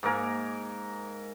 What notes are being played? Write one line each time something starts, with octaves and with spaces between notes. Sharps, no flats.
G#2 A#3 A#4 G#5